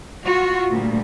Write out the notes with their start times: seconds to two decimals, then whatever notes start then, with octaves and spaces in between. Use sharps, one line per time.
0.25 F4 F#4
0.69 D2 A#2 G3